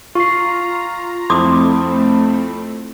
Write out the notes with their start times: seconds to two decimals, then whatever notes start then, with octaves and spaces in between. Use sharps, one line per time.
0.15 F4 A#5 C#6 C7
1.30 F2 A3 C4 E4 C6 D6 D#6